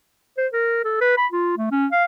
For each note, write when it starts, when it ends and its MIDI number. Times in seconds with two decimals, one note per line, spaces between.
0.38 0.47 72
0.53 0.81 70
0.84 0.99 69
1.01 1.17 71
1.17 1.26 83
1.32 1.56 65
1.57 1.70 57
1.71 1.87 61
1.92 2.05 77